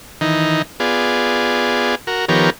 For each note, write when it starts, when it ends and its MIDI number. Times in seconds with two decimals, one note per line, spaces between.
0.21 0.62 51
0.21 0.62 52
0.21 0.62 63
0.80 1.95 59
0.80 1.95 65
0.80 1.95 68
0.80 1.95 74
2.07 2.25 66
2.07 2.25 70
2.29 2.50 51
2.29 2.50 53
2.29 2.50 59
2.29 2.50 67
2.29 2.50 70
2.29 2.50 73